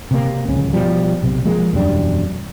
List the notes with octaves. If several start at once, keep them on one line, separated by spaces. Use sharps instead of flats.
C3 A#3
D1 C#2 C#4
B2 F3 G3
B1 C3
F3 G#3 A#3
E1 F#2 G3 D4